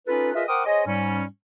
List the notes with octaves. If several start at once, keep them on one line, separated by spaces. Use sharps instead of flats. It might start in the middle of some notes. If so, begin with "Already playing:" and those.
C#4 D#4 F4 A4 B4
F4 G#4 A#4 B4 D#5 E5
A#4 C5 F#5 G5 D6 D#6
G#4 C5 C#5 D#5
G#2 G3 C#4